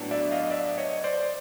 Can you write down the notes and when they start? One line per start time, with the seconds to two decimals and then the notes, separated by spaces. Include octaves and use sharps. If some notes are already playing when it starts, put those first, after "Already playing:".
Already playing: A2 F#3 B3 D4
0.11 D5 E5
0.32 D#5 F5
0.51 D5 E5
0.78 C#5 D#5
1.04 C5 D5